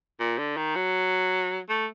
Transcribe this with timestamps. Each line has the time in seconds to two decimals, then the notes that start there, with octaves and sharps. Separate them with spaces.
0.20 A#2
0.38 D3
0.56 D#3
0.75 F#3
1.69 A3